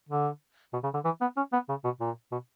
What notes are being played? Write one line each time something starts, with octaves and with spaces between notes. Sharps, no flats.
D3
B2
C#3
D3
E3
B3
C#4
B3
C#3
B2
A#2
B2